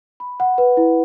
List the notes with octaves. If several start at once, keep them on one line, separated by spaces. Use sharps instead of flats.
B5
F#5
B4
E4